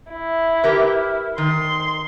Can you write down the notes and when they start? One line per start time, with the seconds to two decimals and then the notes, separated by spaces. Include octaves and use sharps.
0.13 E4
0.64 G4 A#4 B4
1.38 D#3 C6